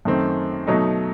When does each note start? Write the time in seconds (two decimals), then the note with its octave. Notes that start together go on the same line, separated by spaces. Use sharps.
0.05 F#2 D#3 A3 C4
0.67 B2 F#3 A3 D#4